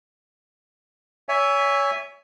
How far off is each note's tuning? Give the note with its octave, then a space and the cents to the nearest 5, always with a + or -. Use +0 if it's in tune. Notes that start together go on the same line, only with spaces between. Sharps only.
C#5 +25 E5 +0 G#5 -10